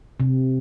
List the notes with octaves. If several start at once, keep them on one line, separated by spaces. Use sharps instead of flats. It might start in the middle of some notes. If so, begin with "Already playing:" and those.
C3